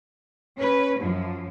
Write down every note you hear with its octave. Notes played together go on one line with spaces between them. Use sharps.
C#4 B4
F#2 F3